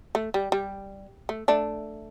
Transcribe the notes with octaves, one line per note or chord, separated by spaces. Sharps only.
A3
G3
G3
A3
A3 D4